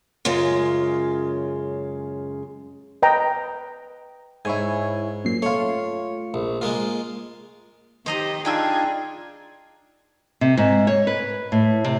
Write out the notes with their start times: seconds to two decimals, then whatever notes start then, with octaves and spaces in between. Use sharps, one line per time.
0.25 F#2 C#3 G#3 F4
3.02 B4 D#5 G5 A#5
4.45 G#2 E4 C#5 G#5
5.25 F#2 A#2 C7
5.42 A3 F4 C#5
6.34 A#1
6.61 G#3 A#3 F4
8.06 D#3 G4 C5 D#5 A#5 D#6
8.45 D4 D#4 F4 G#4 G5 G#5 E6 G#6
10.41 C3
10.57 G#2
10.87 C#5
11.07 B4
11.52 A2
11.85 C3